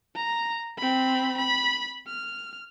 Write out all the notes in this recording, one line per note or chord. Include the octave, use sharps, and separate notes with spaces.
A#5
C4 B5
B5
F6